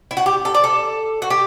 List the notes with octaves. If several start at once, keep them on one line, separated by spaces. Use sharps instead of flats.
E4
F#4
G4
A4
D5
A4
F#4
G4